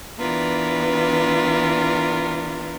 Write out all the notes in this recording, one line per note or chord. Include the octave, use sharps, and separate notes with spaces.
E3 B3 D4 F4 A#4 B4